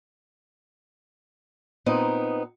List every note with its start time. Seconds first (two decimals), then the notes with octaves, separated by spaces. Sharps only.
1.86 A#2 B3 C4 D#4